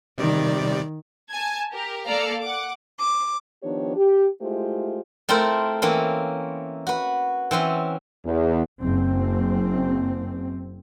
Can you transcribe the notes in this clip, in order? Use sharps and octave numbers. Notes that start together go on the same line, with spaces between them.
C3 D#3 G3 D5
G#5 A5 G#6
G4 A#4
A#3 A4 D5 F5 A#5
F#5 D6
D6
D#3 F3 B3 D4 G4 C#5
G4
G#3 A3 E4 F4 G4 C5
A3 C4 E4 F4 A#4 C5
E3 A#3 C4 C#4
F#4 B4
E3 C4 C#4 C6
E2
F#1 C4